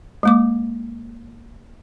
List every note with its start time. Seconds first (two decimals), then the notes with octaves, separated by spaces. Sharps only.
0.23 G#3 A#3 D6